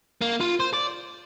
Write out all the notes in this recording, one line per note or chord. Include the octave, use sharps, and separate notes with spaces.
A#3
F4
C5
D5